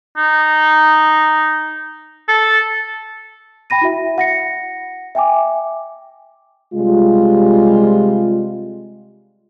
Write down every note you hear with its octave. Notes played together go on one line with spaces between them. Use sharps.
D#4
A4
G5 B5 A#6 D#7
E4 F#4 E5
F#5 A#6 C#7
E5 G5 G#5 D6
C3 G3 G#3 F4